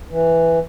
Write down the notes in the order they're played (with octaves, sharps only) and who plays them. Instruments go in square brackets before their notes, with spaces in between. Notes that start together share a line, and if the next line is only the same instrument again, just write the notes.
[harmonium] E3